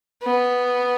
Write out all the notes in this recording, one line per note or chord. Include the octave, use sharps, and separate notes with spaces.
B3